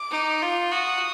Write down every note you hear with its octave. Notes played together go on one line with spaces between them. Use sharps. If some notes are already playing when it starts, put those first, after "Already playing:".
Already playing: D6
D#4
F4
F#4 D#6